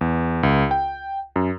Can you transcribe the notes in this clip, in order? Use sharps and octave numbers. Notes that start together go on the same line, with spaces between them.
E2
C#2
G5
F#2